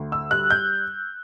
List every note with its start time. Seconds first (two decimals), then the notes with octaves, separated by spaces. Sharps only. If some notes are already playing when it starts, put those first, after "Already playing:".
Already playing: D2
0.12 E6
0.31 G3 F#6
0.50 G6